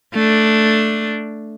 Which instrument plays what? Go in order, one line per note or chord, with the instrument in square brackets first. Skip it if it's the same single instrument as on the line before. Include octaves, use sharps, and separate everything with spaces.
[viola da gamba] A3 D4